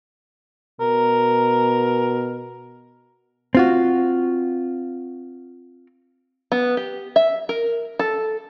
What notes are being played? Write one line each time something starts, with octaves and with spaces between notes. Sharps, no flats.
B2 A#4
C4 F4 F#4
B3
G4
E5
A#4
A4